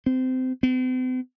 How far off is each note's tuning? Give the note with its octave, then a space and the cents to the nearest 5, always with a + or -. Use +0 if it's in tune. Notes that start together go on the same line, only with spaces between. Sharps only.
C4 -25
C4 -45